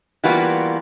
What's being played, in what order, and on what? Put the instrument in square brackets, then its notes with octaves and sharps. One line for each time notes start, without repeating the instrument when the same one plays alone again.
[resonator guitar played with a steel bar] E3 G3 A#3 B3 F4 F#4